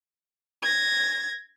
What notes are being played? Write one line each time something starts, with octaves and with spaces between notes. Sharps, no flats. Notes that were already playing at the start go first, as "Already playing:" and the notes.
G#6 A#6